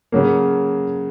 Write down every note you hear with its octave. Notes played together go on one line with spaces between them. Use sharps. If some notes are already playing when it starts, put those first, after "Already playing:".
C#3 F#3 A#3